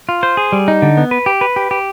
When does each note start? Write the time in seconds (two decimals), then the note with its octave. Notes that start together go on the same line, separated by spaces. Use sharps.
0.09 F4
0.23 C5
0.37 G#4
0.52 G3
0.68 D#4
0.82 D3
0.97 B3
1.11 B4
1.26 G4
1.41 B4
1.56 G4
1.71 G4